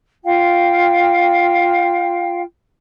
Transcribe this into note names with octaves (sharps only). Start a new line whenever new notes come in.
F4 F5 G5